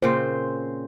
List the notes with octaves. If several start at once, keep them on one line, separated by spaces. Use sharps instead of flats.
A#2 C#3 C4 C5